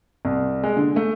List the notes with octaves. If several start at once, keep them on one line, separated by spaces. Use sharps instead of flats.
C2
G#3
D3
A3